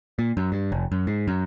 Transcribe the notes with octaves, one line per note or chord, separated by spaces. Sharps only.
A#2
F#2
G2
F1
F#2
G#2
F#2